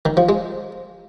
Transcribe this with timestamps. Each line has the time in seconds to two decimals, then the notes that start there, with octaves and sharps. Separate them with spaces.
0.05 D#3
0.17 F3
0.29 G#3